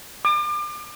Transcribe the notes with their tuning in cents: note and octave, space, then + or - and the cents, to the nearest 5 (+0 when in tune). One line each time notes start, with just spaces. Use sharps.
D6 +35